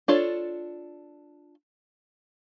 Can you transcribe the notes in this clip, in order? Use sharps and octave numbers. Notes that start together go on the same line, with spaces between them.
D4 F4 A4 C#5